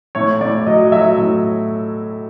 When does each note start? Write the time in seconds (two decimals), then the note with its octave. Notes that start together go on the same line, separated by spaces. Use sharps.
0.15 A2 C#5
0.41 A2 D5
0.67 F#3 D#5
0.92 F#3 E5
1.18 A2